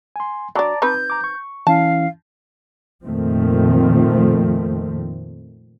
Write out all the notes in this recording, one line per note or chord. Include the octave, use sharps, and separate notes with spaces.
G#5 C6
F#3 D4 D5 A5 A#5 D6
C4 D#4 B4 G6
A#5 D6
C#6
E3 C#4 E4 F5 A5
F2 A#2 D#3 F3 A3 C4